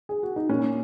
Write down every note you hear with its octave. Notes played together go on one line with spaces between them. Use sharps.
G#4
F#4
D#4
A#2 C#4